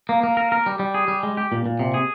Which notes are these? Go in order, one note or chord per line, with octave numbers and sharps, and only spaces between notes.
A#3
A#3
A#4
A#4
G3
G3
G#4
G3
G#3
G4
A#2
A#2
C3
G#4